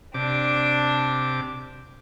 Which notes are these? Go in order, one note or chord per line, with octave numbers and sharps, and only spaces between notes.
C3 D4 D6